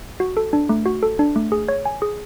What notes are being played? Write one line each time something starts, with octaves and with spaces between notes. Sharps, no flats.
F#4
A4
D4
A3
F#4
A4
D4
A3
G#4
C#5
G#5
G#4